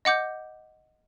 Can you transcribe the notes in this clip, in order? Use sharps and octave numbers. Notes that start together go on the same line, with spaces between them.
D#5 F#5 D6 G6